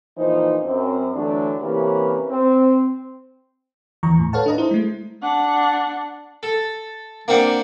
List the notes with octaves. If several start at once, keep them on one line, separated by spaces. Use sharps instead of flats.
A#2 E3 F3 D#4 C5
F#2 C4
D3 E3 F#3 A3 D4
C3 E3 A#3 C#4 G4 B4
C4
D#2 E3 A#5 C#6
A2
A4 B4 C#5 F5 F#5 A5
D4 D#5 A#5
E4 C5
G#3 A3
D4 F#5
A4
A#3 C4 D4 F#5